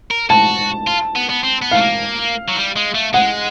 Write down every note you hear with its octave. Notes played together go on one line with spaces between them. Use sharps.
A#4
F#4 A5
F4
B3
B3
C4
B3
A3 F5
A#3
F#3
G3
G#3
A3
G#3 F#5